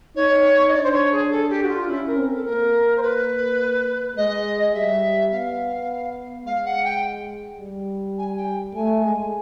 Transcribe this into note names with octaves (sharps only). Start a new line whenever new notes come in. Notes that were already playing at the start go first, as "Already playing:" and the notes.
D#4 C#5
D#5
D4 D5
C5
C#5
G#4
A4
G4
F#4
F4
C#4 E4
A#4
C4
A4
A#3 A#4
C5
B4
G#3 D#5
G3 E5
B3 F5
G#3 F5
F#5
G5
G3
G#5
G5
A3 G#5
G#3